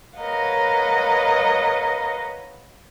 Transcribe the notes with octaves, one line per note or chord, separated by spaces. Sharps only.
A#4 B4 C#5 D#5 F5 F#5